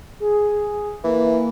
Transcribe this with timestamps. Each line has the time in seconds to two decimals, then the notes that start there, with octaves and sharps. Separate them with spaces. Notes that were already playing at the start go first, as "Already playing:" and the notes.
0.20 G#4
1.04 E3 A#3